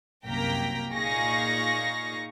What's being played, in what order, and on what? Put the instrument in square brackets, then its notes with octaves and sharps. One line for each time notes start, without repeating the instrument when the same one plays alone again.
[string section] C2 F#2 A#3 G5 A#5 B6
A#2 D#4 G#4 F5 C#6 A#6